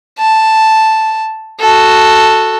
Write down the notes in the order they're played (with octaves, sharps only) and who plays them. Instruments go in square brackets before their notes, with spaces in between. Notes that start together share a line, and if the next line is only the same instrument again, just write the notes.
[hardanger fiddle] A5
F#4 A4